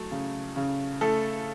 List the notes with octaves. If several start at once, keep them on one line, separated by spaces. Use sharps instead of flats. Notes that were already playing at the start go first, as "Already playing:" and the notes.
Already playing: F#3 A3
C#3
C#3
A3 A4